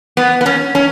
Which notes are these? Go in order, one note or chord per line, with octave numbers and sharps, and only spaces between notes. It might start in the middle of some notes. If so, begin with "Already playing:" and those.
B3
B3
C#4
C#4